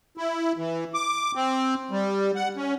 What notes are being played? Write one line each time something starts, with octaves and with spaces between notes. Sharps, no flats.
E4
E3
D6
C4
G3
F#5
C#4